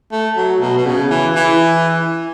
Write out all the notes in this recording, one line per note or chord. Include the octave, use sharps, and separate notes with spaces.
A3
F#3
B2
B2
C#3
E3
E3